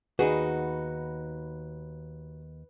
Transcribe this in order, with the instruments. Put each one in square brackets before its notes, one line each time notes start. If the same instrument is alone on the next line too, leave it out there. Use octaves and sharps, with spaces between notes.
[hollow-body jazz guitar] D#2 G#4 [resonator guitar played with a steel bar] D#4 F#4 [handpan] B4